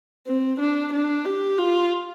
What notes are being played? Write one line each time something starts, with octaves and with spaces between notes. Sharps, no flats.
C4
D4
D4
G4
F4